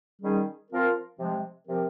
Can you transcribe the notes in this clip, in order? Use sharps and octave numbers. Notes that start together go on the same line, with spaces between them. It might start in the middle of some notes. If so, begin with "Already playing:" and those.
D#3 G3 C#4 G#4
F3 C4 F4 A#4
C3 F3 G#3
C3 F3 C4 G4 A#4